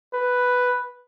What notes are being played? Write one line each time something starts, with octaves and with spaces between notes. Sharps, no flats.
B4